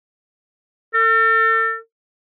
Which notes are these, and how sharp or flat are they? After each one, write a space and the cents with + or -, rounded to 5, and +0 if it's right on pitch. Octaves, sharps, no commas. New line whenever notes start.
A4 +40